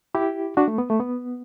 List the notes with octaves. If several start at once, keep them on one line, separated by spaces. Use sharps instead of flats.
E4 G4
D4 F#4
A3
B3
A3
B3